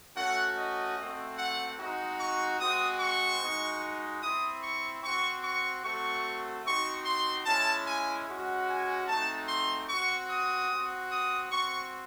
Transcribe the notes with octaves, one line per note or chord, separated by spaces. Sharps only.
A3 C#4 F#4 F#5
D#5
A3 C4 F#4
F#5
G#3 C4 D#4 F#4
C#6
G#3 C4 F#4 D#6
C#6
G#3 D#4 F#4
C4 E4 D#6
C#6
C4 F#4 C#6
C#6
A3 C4 F#4 C#6
C4 D#4 F#4 C#6
C6
G#3 C#4 E4 A5
G#5
G#3 C#4 F#4
G#5
A3 C4 D#4 F#4 A5
C6
C4 F#4 C#6
D#6
C4 F#4
D#6
C4 F#4 C#6